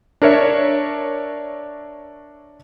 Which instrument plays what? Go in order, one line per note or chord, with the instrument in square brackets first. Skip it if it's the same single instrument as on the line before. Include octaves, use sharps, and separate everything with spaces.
[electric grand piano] D4 A#4 C#5 E5